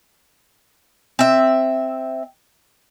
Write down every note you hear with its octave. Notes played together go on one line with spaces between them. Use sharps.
C4 E5